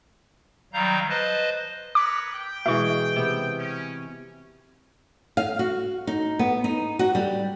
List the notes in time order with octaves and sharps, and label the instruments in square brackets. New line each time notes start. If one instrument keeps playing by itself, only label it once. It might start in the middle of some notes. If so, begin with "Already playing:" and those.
[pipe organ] D#3 F#3 G3 F5 A#5 G6
B4 C5 D#5 A5
[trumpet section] A#4 B4 C#5 [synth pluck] D6
[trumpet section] G5
[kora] B2 E3 G#3 [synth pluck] E5 C#6
[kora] C3 B3
[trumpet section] C#4
[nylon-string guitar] F5
F#4
D#4
B3
D#4
F#4
G3